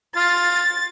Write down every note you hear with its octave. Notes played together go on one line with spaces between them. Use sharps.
F4 A6